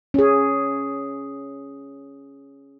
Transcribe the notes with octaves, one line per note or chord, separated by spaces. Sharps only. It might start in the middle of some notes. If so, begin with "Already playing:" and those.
C#4 G#4